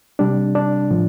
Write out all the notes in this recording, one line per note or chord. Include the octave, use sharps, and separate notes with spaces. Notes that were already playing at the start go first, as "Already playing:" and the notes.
C3 G3 D4
D4
A2 F3